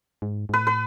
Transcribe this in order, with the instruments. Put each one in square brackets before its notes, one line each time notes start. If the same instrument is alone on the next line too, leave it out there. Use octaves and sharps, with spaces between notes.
[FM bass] G#2
G#2
[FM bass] A2 [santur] B4
[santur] B4